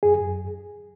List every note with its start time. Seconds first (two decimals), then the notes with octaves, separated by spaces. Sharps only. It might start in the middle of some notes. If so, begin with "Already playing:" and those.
0.03 F#2 G#4
0.20 F#2